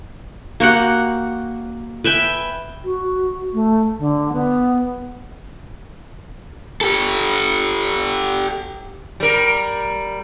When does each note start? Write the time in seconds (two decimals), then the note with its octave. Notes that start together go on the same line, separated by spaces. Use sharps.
0.60 A#3 F#4 G4 F#5
2.04 B4 E5 G5 G#5
2.84 F#4
3.54 A3
3.99 D3
4.33 B3
6.81 G4 A4
9.20 G3 A#4